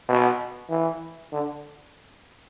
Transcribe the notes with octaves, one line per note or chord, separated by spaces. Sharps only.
B2
E3
D3